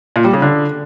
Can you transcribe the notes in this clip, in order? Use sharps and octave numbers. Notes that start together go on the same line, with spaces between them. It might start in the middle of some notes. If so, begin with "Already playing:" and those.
A#2
G3
C#3
D3